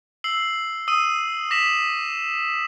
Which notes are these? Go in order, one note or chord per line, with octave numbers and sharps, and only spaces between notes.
E6 C7 F#7
D#6 E6 D#7
D6 A#6 B6 E7 F#7